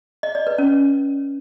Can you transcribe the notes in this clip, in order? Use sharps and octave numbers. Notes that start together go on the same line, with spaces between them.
D#5
D5
B4
C#4